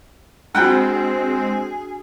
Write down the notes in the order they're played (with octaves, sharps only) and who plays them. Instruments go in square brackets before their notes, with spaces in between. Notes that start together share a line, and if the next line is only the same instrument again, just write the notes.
[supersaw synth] G#3 C4 [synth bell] D4 F#4 [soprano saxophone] G#4 [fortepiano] F#5 G5 B5